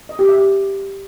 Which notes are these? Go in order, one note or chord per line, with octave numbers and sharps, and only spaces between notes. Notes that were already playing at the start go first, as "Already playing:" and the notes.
D#5
G4
E5
G4